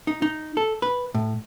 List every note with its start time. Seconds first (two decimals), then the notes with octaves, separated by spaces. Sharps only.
0.07 D#4
0.22 D#4
0.57 A4
0.82 B4
1.14 A2